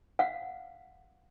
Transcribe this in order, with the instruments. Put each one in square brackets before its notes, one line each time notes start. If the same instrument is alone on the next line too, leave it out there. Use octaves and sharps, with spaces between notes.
[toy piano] F5 F#5